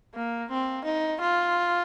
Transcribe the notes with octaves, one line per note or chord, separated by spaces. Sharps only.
A#3
C4
D#4
F4